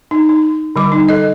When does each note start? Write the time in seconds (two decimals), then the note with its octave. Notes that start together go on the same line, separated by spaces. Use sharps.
0.11 D#4
0.29 D#4
0.76 D3 G3 D6
0.92 D#4
1.09 A4 D#5